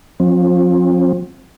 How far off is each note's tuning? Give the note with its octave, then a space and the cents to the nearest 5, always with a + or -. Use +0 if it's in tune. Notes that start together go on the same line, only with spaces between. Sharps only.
F3 +25 C4 +40